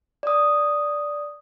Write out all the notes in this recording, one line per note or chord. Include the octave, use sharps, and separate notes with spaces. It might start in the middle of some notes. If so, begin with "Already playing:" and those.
D5 D#6